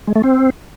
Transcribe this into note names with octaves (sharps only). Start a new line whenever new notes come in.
G#3
A3
C4